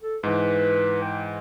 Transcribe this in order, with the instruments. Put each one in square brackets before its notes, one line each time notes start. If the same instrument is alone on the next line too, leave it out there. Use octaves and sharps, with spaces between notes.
[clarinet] A4
[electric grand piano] G#2 E3 [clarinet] B4
[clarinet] G5